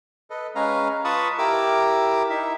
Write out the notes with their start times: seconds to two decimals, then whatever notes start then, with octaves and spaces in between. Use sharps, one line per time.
0.30 A4 B4 D#5
0.55 G#3 C#4 B4 F5 A#5
1.05 F4 B4 A5 B5 C#6 D#6
1.38 E4 G4 A#4 D6 E6
2.30 D#4 E4 E5